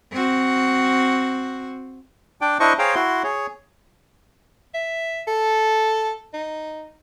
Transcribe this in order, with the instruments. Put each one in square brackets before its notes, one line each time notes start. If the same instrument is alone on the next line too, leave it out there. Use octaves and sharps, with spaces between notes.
[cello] C4 F#4
[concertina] D4 D5 G5
D4 E4 C5 D#5 C#6
G#4 C5 C#5 F5 G5 A#5
E4 F#4 C6
G#4 C#5
[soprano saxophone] E5
A4
D#4